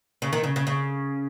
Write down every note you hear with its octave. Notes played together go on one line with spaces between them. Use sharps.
C#3
D#3
C#3
C#3
C#3